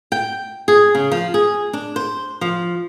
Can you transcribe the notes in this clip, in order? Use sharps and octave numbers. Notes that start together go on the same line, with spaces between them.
G5
G#4
C#3
F3
G#4
D4
C5
F3